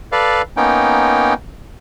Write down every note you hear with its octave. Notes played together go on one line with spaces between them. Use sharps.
A4 B4 D5 F5
A#3 B3 C#4 D#4 G5